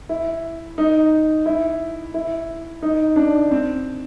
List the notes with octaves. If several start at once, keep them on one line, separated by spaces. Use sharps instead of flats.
E4
D#4
E4
E4
D#4
D4
C4